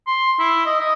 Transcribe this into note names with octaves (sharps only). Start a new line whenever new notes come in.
C6
E4
D#5
D#5